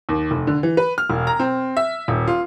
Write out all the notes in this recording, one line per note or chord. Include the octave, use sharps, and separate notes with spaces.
D#2
F1
D3
E3
B4
F6
E1
A#5
C4
E5
D#1
F4